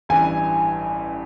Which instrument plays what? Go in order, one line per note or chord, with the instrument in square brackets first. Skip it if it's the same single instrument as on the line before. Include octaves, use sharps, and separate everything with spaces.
[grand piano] A1 G2 E3 G3 [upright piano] G#5